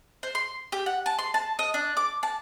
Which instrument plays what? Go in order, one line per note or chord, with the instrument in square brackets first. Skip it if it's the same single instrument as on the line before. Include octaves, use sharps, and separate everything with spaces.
[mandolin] C5
C6
G4
F#5
A5
C6
A5
D#5
D4
D6
A5